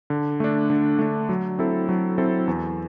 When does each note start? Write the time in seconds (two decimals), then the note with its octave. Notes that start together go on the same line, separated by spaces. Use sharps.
0.10 D3
0.40 A3 D4
0.70 D3
0.99 A3 D4
1.29 F#3
1.59 C4 E4 A4
1.89 F#3
2.18 C4 E4 A4
2.48 E2